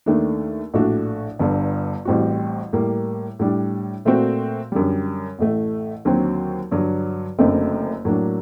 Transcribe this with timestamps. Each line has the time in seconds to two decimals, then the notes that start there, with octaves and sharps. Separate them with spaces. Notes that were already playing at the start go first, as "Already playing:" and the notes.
0.06 D#2 D#3 A3 D4
0.74 A#1 A2 A3 D4 F#4
1.39 G1 G2 D3
2.05 A1 A2 G3 C4 F#4
2.73 A2 G3 A#3
3.39 A2 G3 D4
4.05 A#2 A3 C4 F#4
4.72 F#2 D3 G3
5.39 A1 A2 A3
6.05 D#2 D3 F#3 C4 F#4
6.71 G2 D3 F#3
7.39 F#1 F#2 D3 A3 C4
8.05 A2 F#3 A#3 D4